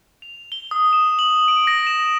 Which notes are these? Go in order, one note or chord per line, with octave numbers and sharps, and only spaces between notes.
F7
G7
D#6
E7
F#7
D7
A#6
E7